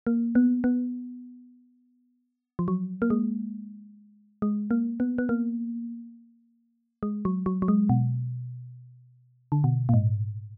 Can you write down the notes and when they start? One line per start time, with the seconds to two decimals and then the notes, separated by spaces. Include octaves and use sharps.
0.07 A#3
0.35 B3
0.64 B3
2.59 F3
2.68 F#3
3.02 A#3
3.10 G#3
4.42 G#3
4.71 A#3
5.00 B3
5.18 B3
5.29 A#3
7.03 G#3
7.25 F#3
7.46 F#3
7.62 F#3
7.68 G#3
7.89 B2
9.52 D3
9.64 B2
9.89 A#2
9.94 G#2